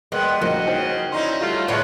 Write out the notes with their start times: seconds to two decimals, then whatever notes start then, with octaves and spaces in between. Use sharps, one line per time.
0.12 G3 G#3 A#3 B3
0.42 A#1 A#3 F#4 C5 D#5 C6
0.67 C#3 D#4 C5 G5
1.12 C#4 D#4 E4 D5 C6
1.41 F#3 G3 A3 F4
1.68 A2 D3 G#3 B3 E4 C#5 D5 A5